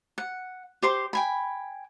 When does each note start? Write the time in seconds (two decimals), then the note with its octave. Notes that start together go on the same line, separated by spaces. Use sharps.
0.18 F#5
0.82 G4 C5 C6
1.13 G5 G#5 B5